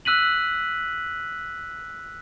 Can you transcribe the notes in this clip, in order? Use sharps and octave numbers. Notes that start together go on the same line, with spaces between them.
E6 F#6 B6 D#7 F#7